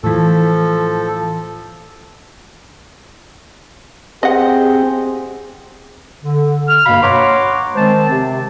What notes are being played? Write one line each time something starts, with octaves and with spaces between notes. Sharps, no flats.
A2 E3 F3 A4
C4 G4 G#4 D#5 F#5
D3
F6
G2 B2 A#3 F5 B5
C#5 F#5 A#5 C6 D6
D#3 G#3 C4 C5 A5
C3